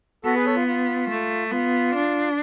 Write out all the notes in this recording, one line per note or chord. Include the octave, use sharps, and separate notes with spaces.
B3 F#4 A4
G#4 B4
A4 C#5
F4
F4
A3
B3 F4
D4